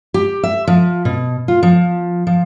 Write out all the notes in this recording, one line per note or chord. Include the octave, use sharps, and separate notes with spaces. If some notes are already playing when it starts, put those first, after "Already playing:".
G4
E5
F3
B2
F4
F3
F3